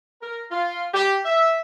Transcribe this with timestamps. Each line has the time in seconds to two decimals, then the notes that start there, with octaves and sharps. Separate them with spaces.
0.21 A#4
0.50 F4
0.94 G4
1.25 E5